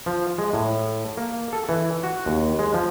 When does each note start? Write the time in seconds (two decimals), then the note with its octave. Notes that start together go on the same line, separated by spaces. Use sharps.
0.06 F3
0.38 G#3
0.53 A2
1.17 A#3
1.53 A4
1.69 E3
2.03 F#4
2.26 D#2
2.59 G#3
2.74 F3